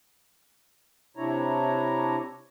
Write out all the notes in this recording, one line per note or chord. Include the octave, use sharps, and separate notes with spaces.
C3 D4 E4 C#5 A#5